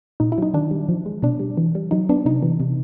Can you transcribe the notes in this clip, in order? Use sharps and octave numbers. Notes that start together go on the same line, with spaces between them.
A#2 D#4
E4
F#3 D#4
D#3 D4
G3
F3
G#3
B2 D4
G3
E3
G3
F#3 D#4
B3 D4
C3 D#4
E3
C3